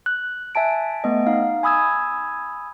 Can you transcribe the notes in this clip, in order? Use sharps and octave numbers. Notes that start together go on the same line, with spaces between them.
F#6
E5 G#5 A5 D7
A3 B3 D#5
D#4 F5
G#5 B5 D#6 E6 G#6